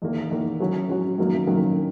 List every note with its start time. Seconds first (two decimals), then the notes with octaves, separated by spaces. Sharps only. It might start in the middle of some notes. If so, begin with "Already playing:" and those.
0.02 E2 D#3 A#3
0.31 E2 D#3 A#3
0.60 F#3 C#4 F#4
0.89 F#3 C#4 F#4
1.18 F#2 D#3 F#3 A#3
1.47 F#2 D#3 F#3 A#3